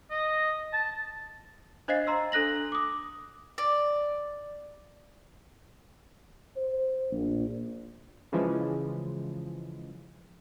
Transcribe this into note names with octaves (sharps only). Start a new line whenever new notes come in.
D#5
A5
D4 C5 D#5 F5 A6 C7
A#5 C6 E6
D4 A4 F#6 A#6 F#7
D6 D#6
D5
C5
A#1
C#3 E3 F3 G#3